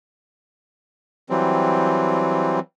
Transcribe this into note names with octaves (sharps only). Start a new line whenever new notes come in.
E3 F#3 G3 C4